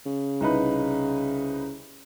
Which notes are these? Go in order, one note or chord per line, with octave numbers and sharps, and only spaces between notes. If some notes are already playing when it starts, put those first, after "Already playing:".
C#3
C2 D#4 B4